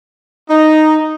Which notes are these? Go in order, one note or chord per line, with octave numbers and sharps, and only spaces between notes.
D#4